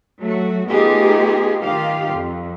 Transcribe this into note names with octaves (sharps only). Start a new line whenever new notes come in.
F#3 A3 F#4
A3 B3 D#4 F4 G4 G#4
D#3 F4 G4 F5
F2